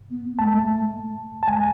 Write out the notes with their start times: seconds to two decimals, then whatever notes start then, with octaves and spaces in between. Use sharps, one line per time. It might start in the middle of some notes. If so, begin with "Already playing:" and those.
0.10 B3
0.39 A3 A5
0.46 G#3
0.54 A3
1.43 A5
1.48 G#3 G#5